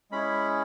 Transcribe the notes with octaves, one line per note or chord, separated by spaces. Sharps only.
G#3 C#4 E4 G#4 B5